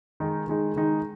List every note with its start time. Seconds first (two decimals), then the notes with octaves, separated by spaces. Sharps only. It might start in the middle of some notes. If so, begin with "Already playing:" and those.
0.20 D#3 G#3 D#4
0.48 D#3 G#3 D#4
0.76 D#3 G#3 D#4